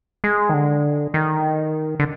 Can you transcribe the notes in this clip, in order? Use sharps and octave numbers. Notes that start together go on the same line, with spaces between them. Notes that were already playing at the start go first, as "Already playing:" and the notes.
G#3
D#3
D3
D#3
D3